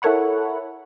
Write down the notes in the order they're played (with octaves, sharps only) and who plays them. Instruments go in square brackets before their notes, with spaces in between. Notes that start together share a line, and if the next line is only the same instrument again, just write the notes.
[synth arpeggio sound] E4 A4 A#4 C#5 F#5 B5